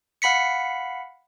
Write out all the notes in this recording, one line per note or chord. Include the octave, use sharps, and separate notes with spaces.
F5 F#5 B5 B6 C#7